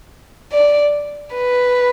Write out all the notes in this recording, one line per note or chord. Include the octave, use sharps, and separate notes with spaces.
D5
B4